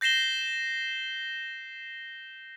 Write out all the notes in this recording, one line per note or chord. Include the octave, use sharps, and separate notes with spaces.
G6 A#6 C7 E7 G7